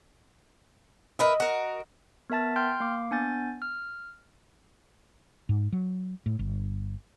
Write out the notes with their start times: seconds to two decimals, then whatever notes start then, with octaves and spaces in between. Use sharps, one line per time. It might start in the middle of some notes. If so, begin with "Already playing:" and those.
1.19 A#4 B4 D#5 E5
1.40 F#4 A#4
2.30 B3 A#4 E5 A5 A6
2.56 G5 C6 F6 G6
2.80 A#3 F5 D6
3.11 B3 D4 G#5 G6 A6
3.62 F6
5.49 G#2
5.73 F#3
6.26 A2
6.39 G1